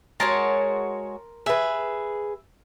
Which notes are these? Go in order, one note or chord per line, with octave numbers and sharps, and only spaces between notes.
G#3 F#4 A#4 C#5 A5 C6
G#4 B4 E5